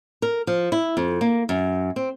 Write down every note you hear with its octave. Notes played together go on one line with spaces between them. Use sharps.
A#4
F3
E4
F2
A#3
F#2
C4